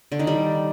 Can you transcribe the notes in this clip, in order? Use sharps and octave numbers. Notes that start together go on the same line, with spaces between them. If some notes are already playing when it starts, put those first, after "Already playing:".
D3
D#3
G3